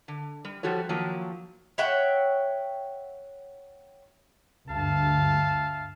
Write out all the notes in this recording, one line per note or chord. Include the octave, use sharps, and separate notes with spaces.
D3
G3
F3 G3 F#4 A4 C#5
D#3 F3 F#3 A#3
C#5 E5 F#5 G5
D2 G2 E5 F5 A5